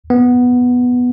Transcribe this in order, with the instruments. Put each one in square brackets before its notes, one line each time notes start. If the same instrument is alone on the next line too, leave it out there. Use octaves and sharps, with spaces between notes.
[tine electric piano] B3